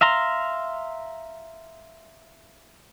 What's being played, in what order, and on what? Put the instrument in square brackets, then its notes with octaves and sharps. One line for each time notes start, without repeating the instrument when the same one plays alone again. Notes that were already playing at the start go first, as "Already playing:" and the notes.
[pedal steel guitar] E5 F5 A#5 C6